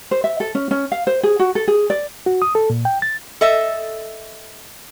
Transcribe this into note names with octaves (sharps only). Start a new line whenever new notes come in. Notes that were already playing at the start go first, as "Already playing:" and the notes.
C5
E5
A4
C#4
C#4
F5
C5
G#4
F#4
A4
G#4
D5
F#4
D#6
A4
A#2
G5
A6
A4 D#5 E5